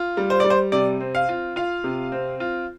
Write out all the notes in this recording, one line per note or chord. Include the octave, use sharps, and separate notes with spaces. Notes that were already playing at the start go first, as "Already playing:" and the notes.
Already playing: F4
G3
C5
G3 D5
C5
C3 D5
C4
F5
F4
F4 F5
C3
C4
F4